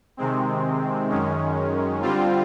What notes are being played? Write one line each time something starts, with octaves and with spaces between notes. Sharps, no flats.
C3 D#3 G#3 C4
F#2 D#3 G#3 C#4
D3 G3 C4 F4